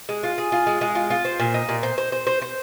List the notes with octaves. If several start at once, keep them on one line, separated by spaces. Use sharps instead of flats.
G#3
F4
G#4
F4
G#3
G#3
F4
F4
C5
A#2
D#4
A#2
C5
C5
C5
C5
C5